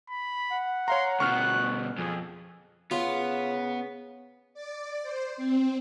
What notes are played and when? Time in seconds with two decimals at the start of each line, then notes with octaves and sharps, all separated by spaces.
0.10 B5
0.51 F#5
0.88 C#5 F5 A#5 C6
1.20 D2 B2 C#6 F6 F#6
1.98 F2 G#4
2.91 C#3 B3 F4
4.54 D5
5.02 C5
5.37 C4